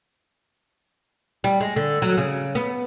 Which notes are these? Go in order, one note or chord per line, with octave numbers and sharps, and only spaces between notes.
G3
G#3
D3
F#3
C#3
B3